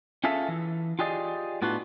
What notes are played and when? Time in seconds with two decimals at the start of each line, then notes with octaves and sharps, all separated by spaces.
0.24 C#4 F4 G#4 A4 E5
0.48 E3
0.99 F4 G4 G#4 D5 D#5
1.62 A2 B3 D4 F4 F#4